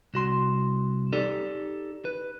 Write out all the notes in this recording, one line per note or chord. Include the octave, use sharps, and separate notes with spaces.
C2 F#4 C6
D#4 G4 A4 D5
B4